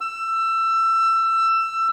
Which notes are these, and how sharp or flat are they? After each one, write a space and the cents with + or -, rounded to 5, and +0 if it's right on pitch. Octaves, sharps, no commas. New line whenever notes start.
E6 +20